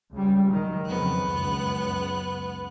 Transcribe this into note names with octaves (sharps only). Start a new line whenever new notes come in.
C#2 C#3 G3
D#3 F#3
F2 C#3 B3 F#6
C#2 F#2